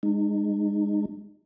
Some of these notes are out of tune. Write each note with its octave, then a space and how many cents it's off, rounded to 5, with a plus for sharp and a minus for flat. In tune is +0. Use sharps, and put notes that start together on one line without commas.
G#3 -15 D#4 -35